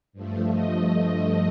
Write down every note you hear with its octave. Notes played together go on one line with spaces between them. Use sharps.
G2 F3 A3
D#5